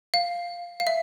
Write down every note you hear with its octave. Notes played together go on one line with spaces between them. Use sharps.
F5
F5
E5